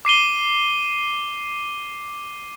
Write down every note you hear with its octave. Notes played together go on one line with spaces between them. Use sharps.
D6 C7 D#7 G7